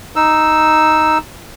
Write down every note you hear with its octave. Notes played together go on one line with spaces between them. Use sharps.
D#4 E6